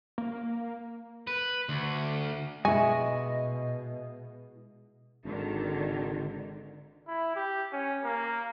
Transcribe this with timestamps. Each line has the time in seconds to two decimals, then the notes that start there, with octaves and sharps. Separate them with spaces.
0.18 A#3
1.27 B4
1.69 D2
2.65 B2 G#3 E4 D#5 G#5 C#6
5.25 G#1 D3 D#3
7.07 E4
7.36 G4
7.73 C#4
8.04 A#3